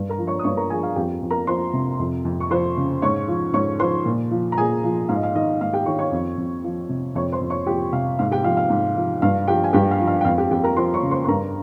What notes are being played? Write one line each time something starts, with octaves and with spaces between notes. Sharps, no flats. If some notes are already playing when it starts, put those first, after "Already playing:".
Already playing: G2
A#4 A#5
F3
C#5 C#6
D#6
G2 C#5 C#6
A#4 A#5
F3 G#4 G#5
F5
F2 G4 G5
F2
A#4 A#5
F3 C5 C6
C3
F2
F2
C#6
F3 C5 C6
C#3
G#2 C#5 C#6
F3
G#2 C#5 C#6
F3 C5 C6
A#2
F3
A#5
A#2 G#4 G#5
F3
G#2 F5
D#5
F5
D#3 D#5
G#2 F5
G4 G5
D#3 C#5 C#6
C#5 C#6
F2
F2
F3
C3
F2 C#5 C#6
C5 C6
F2
C#5 C#6
F3 G4 G5
C3 F5
G#2 F5
G4 G5
F3 F5
F5
G#2
F3
G2 F5
F3 G4 G5
G#5
G2 G4 G5
F5
F3
F5
G5
F2 F5
G4 G5
F2 G4 G5
A#4 A#5
F3 C5 C6
C#5 C#6
C#3
C5 C6
C6
G2 A#4 A#5